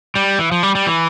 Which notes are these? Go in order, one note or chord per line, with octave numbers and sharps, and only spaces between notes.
G3
E3
F3
G3
G3
E3